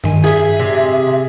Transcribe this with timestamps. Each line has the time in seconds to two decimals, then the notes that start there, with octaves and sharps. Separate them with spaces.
0.04 G2 D#3 G#5
0.24 G#4 E5
0.60 C3